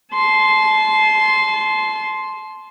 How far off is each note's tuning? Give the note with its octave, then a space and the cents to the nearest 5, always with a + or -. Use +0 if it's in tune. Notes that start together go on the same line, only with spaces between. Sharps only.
A5 -30 C6 +0